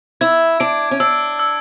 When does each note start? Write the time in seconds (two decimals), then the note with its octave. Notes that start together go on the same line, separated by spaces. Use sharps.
0.21 E4 G#6
0.60 D4 D7
0.91 C#4
1.00 D4 E6
1.39 E6